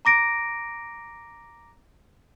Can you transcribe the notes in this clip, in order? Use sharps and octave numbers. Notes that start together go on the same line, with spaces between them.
A#5 D6 A#6 D7